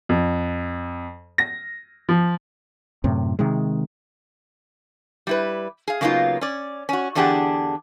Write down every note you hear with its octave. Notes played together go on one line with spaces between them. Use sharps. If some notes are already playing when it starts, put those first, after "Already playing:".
F2
A#6
F3
F#2 A2 C3
C3 D#3 G#3
G3 E4 B4
G#4 F5
C#3 F#3 A#3 B3 D#4 F4
C#4 D5
C#4 F#4
E2 D3 D4 G4 G#4 F#5